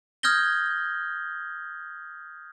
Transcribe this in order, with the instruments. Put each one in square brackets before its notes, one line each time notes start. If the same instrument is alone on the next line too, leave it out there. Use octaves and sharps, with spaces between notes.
[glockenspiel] D#6 F6 G6 G#6 A#6 G7